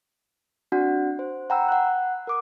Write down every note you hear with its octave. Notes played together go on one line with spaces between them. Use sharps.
C4 D4 F#4 F#5
C5
F#5 G5 A#5 B5 E6
F#5 F#6
A#4 D6 D#6